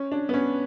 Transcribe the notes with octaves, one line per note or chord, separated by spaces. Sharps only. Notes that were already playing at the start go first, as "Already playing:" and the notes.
Already playing: C#4
D4
B3
C#4